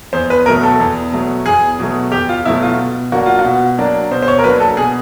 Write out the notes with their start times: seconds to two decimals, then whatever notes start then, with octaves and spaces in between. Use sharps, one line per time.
0.13 E2 C5
0.30 B4
0.46 B2 F#3 A3 A#4
0.63 A4
0.80 E2
1.12 B2 F#3 A3
1.46 E2 G#4
1.79 B2 F#3 A3
2.12 E2 G4
2.29 F4
2.45 B2 F#3 A3 E4
2.63 F4
2.78 B2
3.12 F#3 A#3 D4 F#4
3.26 F4
3.39 F#4
3.45 B2
3.78 F#3 A#3 D4
4.11 B2 C5
4.22 C5
4.28 C#5
4.39 A#4
4.44 F#3 A#3 D4 B4
4.60 A4
4.77 B2 G#4